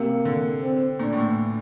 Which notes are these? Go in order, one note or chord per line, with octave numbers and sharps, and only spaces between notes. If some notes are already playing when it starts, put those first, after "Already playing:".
Already playing: C3 A#3
D3
C4
A#2 D4
A2
A#2